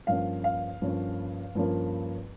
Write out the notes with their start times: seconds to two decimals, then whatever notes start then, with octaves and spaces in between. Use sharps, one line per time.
0.07 G2 F3 A#3 C#4 F5
0.44 F5
0.82 G2 F3 A#3 C#4
1.55 G2 F3 A#3 C#4